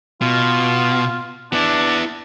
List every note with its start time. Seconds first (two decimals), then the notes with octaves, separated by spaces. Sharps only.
0.22 B2 F4
1.53 B3 D4 E4